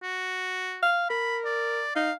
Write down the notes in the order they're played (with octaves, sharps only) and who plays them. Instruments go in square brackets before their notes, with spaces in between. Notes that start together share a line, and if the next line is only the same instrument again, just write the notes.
[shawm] F#4
[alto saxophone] F5
[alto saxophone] A#4 [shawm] B5
[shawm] D5
[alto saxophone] D#4 [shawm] F5